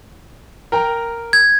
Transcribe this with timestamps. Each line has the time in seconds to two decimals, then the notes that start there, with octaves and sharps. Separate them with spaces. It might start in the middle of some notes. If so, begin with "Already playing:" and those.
0.72 A#4 G5 A#5
1.33 G#6